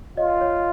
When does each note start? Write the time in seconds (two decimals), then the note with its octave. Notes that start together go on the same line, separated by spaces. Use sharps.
0.17 F4 C#5 D#5
0.41 C#5